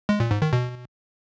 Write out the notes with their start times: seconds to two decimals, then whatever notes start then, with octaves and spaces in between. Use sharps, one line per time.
0.09 G#3
0.20 A#2
0.31 G#2
0.42 D#3
0.53 B2